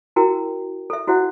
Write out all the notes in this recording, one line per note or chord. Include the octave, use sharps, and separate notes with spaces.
E4 F#4 A#4 G5
A4 E5
E4 F#4 C5 E5 F#5